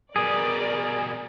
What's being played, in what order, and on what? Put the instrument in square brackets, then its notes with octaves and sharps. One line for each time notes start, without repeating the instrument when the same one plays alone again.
[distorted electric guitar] B2 G3 [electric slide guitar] G#4 [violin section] A#4 D5